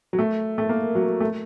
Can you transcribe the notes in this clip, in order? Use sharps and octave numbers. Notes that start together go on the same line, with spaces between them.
F#3
A3
A3
A#3
F#3
A3